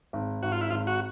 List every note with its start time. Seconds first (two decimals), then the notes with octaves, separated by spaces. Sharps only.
0.13 G#1
0.43 G#1 F#4
0.52 F4
0.61 E4
0.70 G#1 F4
0.87 F#4